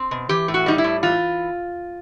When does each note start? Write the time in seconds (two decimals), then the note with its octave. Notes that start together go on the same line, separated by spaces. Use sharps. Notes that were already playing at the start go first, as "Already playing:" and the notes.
Already playing: C4
0.11 B2
0.29 E3 G4
0.48 A2
0.54 F#4
0.66 G3 D#4
0.78 E4
0.84 A2
1.03 E3 F4